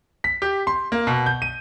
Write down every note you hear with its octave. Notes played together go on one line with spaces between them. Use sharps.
B6
G4
C6
A#3
B2
G6
D#7